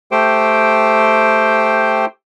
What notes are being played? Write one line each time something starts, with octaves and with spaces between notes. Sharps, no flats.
A3 G4 C5 G5